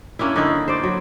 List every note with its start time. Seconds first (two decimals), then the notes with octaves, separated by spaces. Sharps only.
0.19 A#3 C#4 D4 E4
0.36 D3 D#4 E4
0.68 C5 D5
0.83 F#3